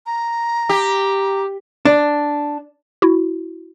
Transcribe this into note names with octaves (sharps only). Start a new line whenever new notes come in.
A#5
G4
D4
E4 F#4